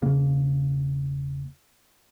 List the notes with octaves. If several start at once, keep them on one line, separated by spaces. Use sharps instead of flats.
E1 C#3 A#3